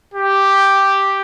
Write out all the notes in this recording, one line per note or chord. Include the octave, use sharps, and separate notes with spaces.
G4